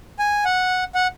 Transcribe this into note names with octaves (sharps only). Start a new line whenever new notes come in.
G#5
F#5
F#5